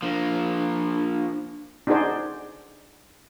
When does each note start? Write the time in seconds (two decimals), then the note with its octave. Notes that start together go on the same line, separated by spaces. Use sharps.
0.02 F3 A#3 D4
1.87 D4 D#4 F#4 G#4 C5 D5